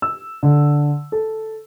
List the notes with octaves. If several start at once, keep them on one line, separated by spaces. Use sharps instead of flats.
E6
D3
A4